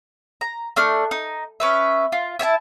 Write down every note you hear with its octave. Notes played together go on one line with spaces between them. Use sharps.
A#5
A3 D4 F6
D#4
C#4 B4 E5
F4
E4 E5 G#5 A5